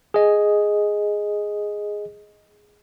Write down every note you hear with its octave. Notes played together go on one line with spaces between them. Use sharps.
G#4 D#5